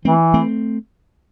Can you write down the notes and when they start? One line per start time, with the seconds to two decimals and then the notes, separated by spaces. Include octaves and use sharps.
0.05 E3 A3 C4
0.34 A3 C4